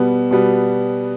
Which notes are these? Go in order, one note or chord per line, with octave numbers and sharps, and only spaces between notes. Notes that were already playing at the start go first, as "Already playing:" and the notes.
Already playing: B2 G3 B3
B2 G3 B3